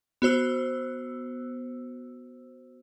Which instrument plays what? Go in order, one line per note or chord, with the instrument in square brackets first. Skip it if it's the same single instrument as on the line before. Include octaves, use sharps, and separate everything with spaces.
[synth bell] B3 F#4 C5 E6